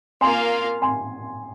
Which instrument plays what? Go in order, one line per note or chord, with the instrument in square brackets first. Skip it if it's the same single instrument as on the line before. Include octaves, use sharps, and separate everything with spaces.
[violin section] A#3 F4 A#4 F5 [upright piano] G#5 C6
[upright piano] G#5 C6